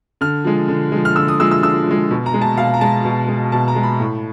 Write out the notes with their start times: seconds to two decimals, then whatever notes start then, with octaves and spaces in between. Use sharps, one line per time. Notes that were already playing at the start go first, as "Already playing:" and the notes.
0.21 D3 F6
0.44 F3 G#3
0.68 D3
0.92 F3 G#3
1.05 F6
1.16 D3 E6
1.28 D#6
1.40 F3 G#3 E6
1.51 E6
1.63 D3 E6
1.87 F3 G#3
2.11 B2
2.26 A#5
2.34 G#3
2.42 A5
2.57 B2 F5
2.74 A#5
2.81 G#3 A5
3.05 B2
3.28 G#3
3.52 B2 A5
3.68 A#5
3.76 G#3
3.83 B5
4.00 A2